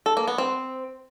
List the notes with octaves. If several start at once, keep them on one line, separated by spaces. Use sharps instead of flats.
A4
A#3
B3
C4